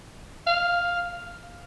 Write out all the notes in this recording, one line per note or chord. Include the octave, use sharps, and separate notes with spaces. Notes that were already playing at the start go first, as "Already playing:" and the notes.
F5